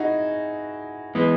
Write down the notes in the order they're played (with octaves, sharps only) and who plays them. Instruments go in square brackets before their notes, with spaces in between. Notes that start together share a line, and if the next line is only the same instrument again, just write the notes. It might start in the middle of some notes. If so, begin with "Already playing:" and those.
Already playing: [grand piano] D#4 E4 F#4 G#4
[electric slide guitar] E3 B3 [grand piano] G#3